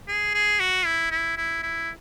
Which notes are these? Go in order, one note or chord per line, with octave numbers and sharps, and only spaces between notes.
G#4
G#4
F#4
E4
E4
E4
E4